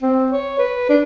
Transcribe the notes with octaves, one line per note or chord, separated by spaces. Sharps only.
C4
C#5
B4
D4